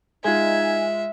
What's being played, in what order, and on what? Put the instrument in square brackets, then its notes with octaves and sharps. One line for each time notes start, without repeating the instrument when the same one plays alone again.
[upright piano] G#3 F4 [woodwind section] D#4 G#5 [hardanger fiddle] E5